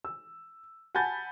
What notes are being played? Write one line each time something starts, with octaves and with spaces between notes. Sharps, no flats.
E6
F#5 G#5 A5 B5 G6 A6